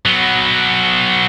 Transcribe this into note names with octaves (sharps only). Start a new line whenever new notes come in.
F#3 B3